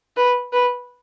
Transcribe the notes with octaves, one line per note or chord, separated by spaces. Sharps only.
B4
B4